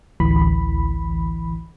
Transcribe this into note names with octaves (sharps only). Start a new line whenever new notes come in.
A1 D2 E3 B5